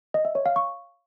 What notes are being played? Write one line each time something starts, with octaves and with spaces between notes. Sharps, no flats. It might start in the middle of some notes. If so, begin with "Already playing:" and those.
D#5
E5
C#5
F5
C#6